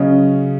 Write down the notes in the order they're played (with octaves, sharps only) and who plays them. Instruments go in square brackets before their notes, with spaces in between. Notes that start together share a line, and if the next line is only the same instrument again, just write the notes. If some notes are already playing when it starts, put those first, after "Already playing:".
Already playing: [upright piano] C#3 F#3 C#4 D#5